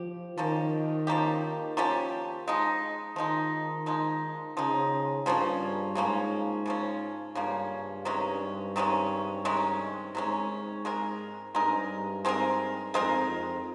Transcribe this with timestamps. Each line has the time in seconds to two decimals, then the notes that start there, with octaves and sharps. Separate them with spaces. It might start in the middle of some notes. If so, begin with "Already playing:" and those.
Already playing: F3 G4
0.37 D#3 F3 A#3 C#4 G4
1.07 F3 A#3 C#4 G4
1.77 F3 A#3 C#4 G4
2.47 F3 G#3 D#4
3.16 D#3 F3 G#3 D#4
3.86 F3 G#3 D#4
4.57 C#3 F3 G#3 D#4
5.26 G2 C#3 F3 A#3 C#4
5.95 G#2 C#3 F3 A#3 C#4
6.66 C#3 F3 A#3 C#4
7.35 G2 C#3 F3 A#3 C#4
8.05 C3 D#3 G#3 C#4
8.76 C3 D#3 G#3 C#4
9.45 C3 D#3 G#3 C#4
10.15 G#2 C3 D#3 G#3 C#4
10.85 G#3 C4 D#4 A#4
11.55 G2 G#3 C4 D#4 A#4
12.25 G#3 C4 D#4 A#4
12.94 F2 G#3 C4 D#4 A#4
13.29 F2